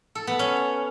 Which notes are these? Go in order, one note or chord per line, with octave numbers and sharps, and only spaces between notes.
A4
B3
C#4